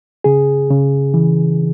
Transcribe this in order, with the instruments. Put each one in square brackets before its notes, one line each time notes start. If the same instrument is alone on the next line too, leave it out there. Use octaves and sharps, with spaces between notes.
[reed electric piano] C#3 G#4
C#3
E3